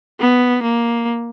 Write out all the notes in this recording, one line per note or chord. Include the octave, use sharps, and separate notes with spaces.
B3
A#3